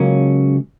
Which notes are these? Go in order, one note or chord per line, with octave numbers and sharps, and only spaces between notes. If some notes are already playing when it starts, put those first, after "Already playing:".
Already playing: C#2 C#3 F#3 A#3 C#4